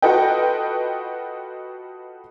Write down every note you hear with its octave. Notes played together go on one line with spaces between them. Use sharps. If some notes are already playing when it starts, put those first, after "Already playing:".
F4 F#4 A4 B4 D#5 G5